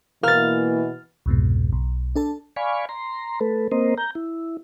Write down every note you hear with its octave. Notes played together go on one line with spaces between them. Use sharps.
B2 E3 A#3 F6 A6
C2 F2 G#2 B2
B1
D4 A4 A5
D5 F5 G#5 B5 C#6
A#5 C6
A3 A4 B4
A#3 C4 A#4 C5 D#5
A#5 G6
E4